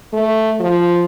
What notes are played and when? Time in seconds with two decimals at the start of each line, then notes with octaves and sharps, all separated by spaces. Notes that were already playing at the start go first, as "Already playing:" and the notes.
0.13 A3
0.60 F3